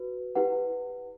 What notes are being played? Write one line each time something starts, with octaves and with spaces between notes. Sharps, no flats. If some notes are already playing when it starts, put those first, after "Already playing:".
Already playing: F#4 B4
E4 G4 B4 F#5